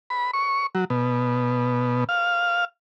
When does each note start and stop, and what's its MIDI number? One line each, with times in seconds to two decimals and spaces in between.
0.10 0.31 83
0.33 0.66 85
0.75 0.85 54
0.90 2.04 47
2.09 2.65 77